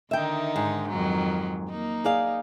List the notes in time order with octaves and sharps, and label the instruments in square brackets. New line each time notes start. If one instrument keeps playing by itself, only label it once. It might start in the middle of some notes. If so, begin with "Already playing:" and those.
[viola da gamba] D3 D#3 D#4 [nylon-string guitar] E5 G5
[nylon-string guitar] G#2
[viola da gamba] F2 D#3 F#3
A#3 D#4
[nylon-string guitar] G#4 D5 F5